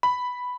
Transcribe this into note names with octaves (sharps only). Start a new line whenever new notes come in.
B5